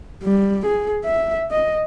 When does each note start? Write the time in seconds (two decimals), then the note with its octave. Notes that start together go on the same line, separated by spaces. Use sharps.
0.23 G3
0.66 G#4
1.05 E5
1.51 D#5